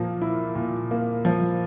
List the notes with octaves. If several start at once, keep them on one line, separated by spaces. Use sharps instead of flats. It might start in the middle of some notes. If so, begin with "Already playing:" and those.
Already playing: A#2 F3 A#3
E4
A#2
A#3
F3